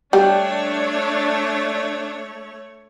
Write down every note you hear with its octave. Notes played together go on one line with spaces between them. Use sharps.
G3 A3 D4 C#5